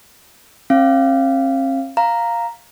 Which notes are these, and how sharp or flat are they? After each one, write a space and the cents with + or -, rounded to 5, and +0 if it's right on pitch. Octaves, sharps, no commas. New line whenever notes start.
C4 +45 F5 -20
F5 +0 A#5 +0